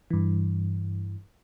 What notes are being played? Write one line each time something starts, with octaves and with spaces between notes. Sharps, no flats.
G2 E3